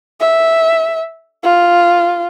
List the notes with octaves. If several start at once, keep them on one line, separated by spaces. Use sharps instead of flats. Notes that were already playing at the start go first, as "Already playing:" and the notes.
E5
F4